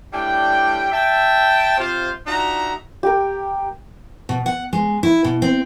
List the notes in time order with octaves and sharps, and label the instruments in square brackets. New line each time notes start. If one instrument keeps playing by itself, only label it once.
[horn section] A2 G3 D4 G5
E5 G5 A5
C3 F4 C5
D4 D#4 F4 F#4 E5 A#5
[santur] G4 A#4
[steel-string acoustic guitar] B2
F#5
G#3
E4
B2
C4